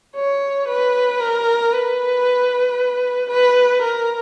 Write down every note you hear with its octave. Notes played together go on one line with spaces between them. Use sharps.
C#5
B4
A#4
B4
B4
A#4